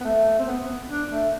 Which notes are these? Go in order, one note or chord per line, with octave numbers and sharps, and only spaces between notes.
B3
A3
C4
B3
D4
A3